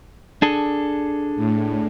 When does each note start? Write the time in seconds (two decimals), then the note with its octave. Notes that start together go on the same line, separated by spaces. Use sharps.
0.42 D4 G#4 A4
1.36 A2